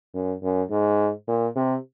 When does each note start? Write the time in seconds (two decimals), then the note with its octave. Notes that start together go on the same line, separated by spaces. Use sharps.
0.14 F#2
0.43 F#2
0.70 G#2
1.28 A#2
1.56 C3